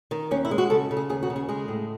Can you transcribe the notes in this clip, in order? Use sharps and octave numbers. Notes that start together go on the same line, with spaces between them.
D#3
D#2 C#4
E4
G#3
F#4
C#3 A4
C#3
G#4
D#2 G#4
F#4
C#3
G#4
G#3 G#4
A2